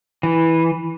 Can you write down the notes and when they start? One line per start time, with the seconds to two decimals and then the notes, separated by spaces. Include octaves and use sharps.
0.23 E3